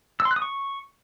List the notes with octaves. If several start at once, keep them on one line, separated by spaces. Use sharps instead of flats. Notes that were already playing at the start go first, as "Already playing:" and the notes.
E6
C6
F#6
D#6
C#6